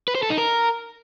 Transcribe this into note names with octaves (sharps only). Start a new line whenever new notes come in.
B4
C5
A4
D#4
A#4